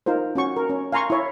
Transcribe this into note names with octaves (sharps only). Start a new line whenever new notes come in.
D#4 F4 A#4 C5
C#4 F#4 C#6
A#4
C#4
F5 G#5 A#5 C6 C#6
E4 C#5